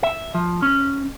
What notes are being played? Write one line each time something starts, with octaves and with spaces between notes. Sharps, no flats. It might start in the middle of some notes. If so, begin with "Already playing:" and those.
E5
F3
C#4